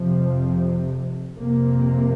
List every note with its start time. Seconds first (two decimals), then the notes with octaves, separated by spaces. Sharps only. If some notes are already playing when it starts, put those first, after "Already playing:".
Already playing: F2 C3 F3
1.37 F2 C3 A#3